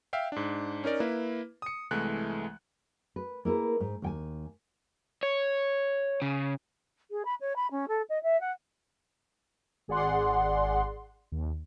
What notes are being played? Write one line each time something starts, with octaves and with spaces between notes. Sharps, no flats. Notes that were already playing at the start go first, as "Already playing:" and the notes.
E5 F5 G5
G#2 D4
C#4 D#4 A#4 D5
A#3 E4 B4
D#6 C#7
C2 E3 G#3 A3 F#6
B4
A#3 E4 G#4 B4
G#2
D#2 G5 G#5
C#5
C#3
G#4
B5
C#5
B5
C#4
A4
D#5
E5
F#5
G#1 G#4 D5 F#5 C6
D#2